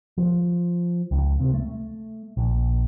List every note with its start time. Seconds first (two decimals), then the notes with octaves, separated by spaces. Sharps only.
0.18 F3
1.11 C#2
1.40 C3
1.54 A3
2.37 A#1